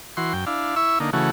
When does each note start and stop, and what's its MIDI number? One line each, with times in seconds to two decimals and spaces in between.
0.17 0.33 52
0.17 0.33 66
0.17 0.33 84
0.33 0.45 42
0.33 0.45 79
0.46 0.75 62
0.46 0.75 64
0.46 0.75 77
0.76 0.99 64
0.76 0.99 76
0.76 0.99 85
0.76 0.99 88
1.00 1.10 50
1.00 1.10 58
1.00 1.10 63
1.13 1.30 49
1.13 1.30 52
1.13 1.30 57
1.13 1.30 66